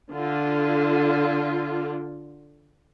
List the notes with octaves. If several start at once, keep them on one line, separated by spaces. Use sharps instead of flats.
D3 F4